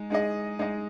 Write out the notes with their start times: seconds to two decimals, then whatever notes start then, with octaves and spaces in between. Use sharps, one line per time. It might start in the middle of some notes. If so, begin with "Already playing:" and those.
Already playing: G#3 D#4
0.10 G#3 D#4 G#4 D#5
0.59 G#3 D#4 G#4 D#5